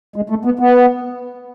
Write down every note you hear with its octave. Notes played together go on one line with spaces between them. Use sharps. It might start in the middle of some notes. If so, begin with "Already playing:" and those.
G#3
A3
B3
B3